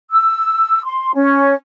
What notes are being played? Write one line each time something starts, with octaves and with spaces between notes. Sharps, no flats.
E6
C6
C#4